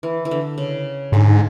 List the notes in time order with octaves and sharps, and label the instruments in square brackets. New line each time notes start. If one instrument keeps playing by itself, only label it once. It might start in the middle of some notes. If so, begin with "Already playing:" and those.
[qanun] E3
E3
D3
C#3
[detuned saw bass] G#2 [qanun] D3